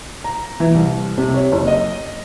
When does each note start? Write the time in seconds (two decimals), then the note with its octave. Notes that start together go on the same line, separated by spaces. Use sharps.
0.24 A#5
0.60 E3
0.74 C2
1.18 C3
1.34 C#5
1.52 F#1
1.67 D#5